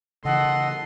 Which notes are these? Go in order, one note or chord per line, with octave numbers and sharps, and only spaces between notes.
C#3 E3 A4 D#5 F#5 C6